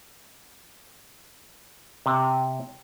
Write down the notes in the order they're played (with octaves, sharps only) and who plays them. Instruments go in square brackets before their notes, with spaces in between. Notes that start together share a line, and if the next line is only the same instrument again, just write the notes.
[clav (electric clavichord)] C3